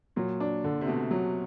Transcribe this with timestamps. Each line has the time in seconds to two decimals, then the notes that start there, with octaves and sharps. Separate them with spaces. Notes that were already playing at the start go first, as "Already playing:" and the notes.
0.16 A#2 F#3
0.40 D4
0.64 D3
0.81 C3
0.87 B2 A3
1.11 F#3